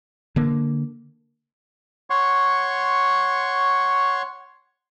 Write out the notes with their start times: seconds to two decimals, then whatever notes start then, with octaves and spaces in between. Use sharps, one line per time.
0.36 D3 A#3
2.10 C#5 F#5 C6 C#6